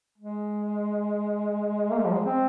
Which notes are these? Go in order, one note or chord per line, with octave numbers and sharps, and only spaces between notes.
G#3
A#3
G#3
F3
G#3
C4